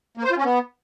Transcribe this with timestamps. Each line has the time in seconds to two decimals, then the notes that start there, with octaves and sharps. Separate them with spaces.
0.17 A#3
0.24 C5
0.31 F4
0.38 C#4
0.44 B3